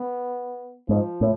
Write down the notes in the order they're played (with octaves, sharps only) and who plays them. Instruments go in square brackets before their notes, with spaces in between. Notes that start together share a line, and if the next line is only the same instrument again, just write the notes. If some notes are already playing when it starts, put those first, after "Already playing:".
Already playing: [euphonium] B3
[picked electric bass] G#2 [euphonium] F3
[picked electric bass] A2